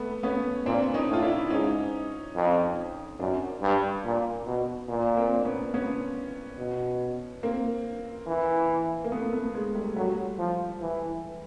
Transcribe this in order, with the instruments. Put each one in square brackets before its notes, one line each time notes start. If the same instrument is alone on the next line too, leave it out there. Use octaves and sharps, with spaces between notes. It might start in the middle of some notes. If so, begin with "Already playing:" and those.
Already playing: [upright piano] A3 B3
B3 C#4
[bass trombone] A#2 [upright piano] C4 D4
[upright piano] C#4 D#4
[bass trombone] A2 [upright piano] F4
[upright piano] D4 E4
[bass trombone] G#2 [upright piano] C#4 D#4
[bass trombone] F2
[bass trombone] F#2 [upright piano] C4 D4
[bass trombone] G2
A#2
B2
A#2
[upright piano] A#3 C4
D4
B3 C#4
B3 C#4
[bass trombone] B2
[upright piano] A#3 C4
[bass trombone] E3
[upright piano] A#3
A3 B3
A3 B3
G#3
G3 A3
[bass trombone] F#3 [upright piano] G3 A3
[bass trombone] F3
E3